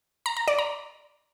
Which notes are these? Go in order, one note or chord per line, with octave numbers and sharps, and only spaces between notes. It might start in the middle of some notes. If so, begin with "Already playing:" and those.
A#5
A#5
D5
A#5